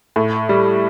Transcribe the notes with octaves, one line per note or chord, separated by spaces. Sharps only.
A2
G3